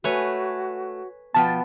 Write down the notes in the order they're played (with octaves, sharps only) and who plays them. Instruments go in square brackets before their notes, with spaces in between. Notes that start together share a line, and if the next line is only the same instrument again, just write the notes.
[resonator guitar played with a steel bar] A3 [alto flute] F#4 [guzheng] B4 C#5 G#5
[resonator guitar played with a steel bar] B2 F3 G5 [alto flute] B3 [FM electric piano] A5